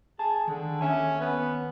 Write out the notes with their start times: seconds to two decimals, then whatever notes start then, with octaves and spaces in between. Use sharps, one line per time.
0.19 G#4 A5
0.48 D3 D#3
0.81 D#2 C#4 E5 G#5
1.20 B3